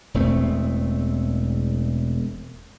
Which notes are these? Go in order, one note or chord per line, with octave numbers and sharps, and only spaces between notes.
E1 E2 A3 C4